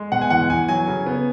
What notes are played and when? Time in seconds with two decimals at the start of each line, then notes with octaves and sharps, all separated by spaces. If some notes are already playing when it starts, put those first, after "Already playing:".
Already playing: G#3
0.12 B2 F#5
0.21 G#5
0.30 E2 F#5
0.50 E2 G#5
0.68 F#3 G#5
0.88 C#3
1.07 B3